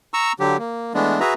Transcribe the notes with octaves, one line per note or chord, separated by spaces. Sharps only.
A#5 C#6 E6
D3 F#3 G4
A#3
E3 G#3 A3 B3 D4
F#4 G#4 B4 E5 A#5